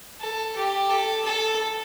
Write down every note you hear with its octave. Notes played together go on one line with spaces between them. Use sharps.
A4
G4
A4
A4